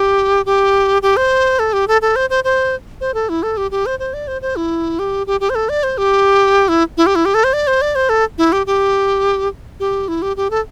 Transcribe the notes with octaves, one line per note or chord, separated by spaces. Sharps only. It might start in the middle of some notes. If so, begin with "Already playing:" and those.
Already playing: G4
G4
G4
C5
A4
G4
A4
A4
C5
C5
C5
C5
A4
E4
A4
G4
G4
C5
C5
D5
C5
C5
E4
G4
G4
G4
C5
A4
D5
C5
G4
E4
E4
G4
E4
G4
A4
C5
D5
C5
D5
C5
A4
E4
G4
G4
G4
E4
G4
G4
A4